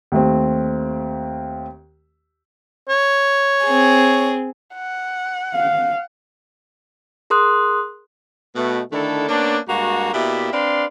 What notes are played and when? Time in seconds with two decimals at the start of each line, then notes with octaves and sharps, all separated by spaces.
0.12 D#2 A3 C4
2.89 C#5
3.65 C4 G#4
4.74 F#5
5.54 F5
7.30 G#4 A#4 C6 D#6 F#6
8.56 B2 A3
8.92 D3 D#3 A3 D4 E4 A4
9.29 A#3 B3 C#4 D4
9.68 G2 G#3 A#3 F#4
10.13 B2 A#3 E4 G4 D5 E5
10.52 C4 D4 B4 D5 F5 C6